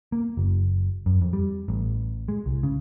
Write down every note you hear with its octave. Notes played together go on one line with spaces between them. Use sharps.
A#3
F#1
F#2
F2
G3
A1
G#3
C2
C#3